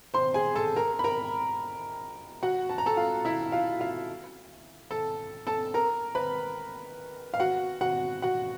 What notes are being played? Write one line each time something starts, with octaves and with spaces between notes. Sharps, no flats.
C5 C6
G#4 G#5
A4 A5
A#4 A#5
B5
A#4 A#5
F#4 F#5
A5
A#5
A4 A5
F4 F5
E4 E5
F4 F5
F4 F5
A4 A5
A4 A5
A#4 A#5
B4 B5
F5
F#4 F#5
F#4 F#5
F#4 F#5